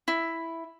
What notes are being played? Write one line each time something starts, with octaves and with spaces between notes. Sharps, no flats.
E4